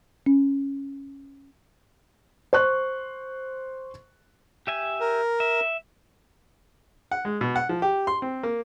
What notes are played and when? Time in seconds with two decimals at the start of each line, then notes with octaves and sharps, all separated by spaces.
0.26 C#4
2.53 C5 C#6 F#6
4.67 G4 E5 G#5
5.00 A#4
5.40 E5
7.11 F#5
7.25 G#3
7.41 B2
7.56 F#5
7.69 F3
7.82 G4
8.07 C6
8.22 C4
8.43 A#3